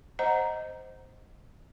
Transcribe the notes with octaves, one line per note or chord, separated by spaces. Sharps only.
C5 D#5 F#5 A#5